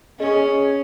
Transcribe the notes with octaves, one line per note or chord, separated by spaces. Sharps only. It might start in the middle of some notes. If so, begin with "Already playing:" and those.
C#4 G#4 D#5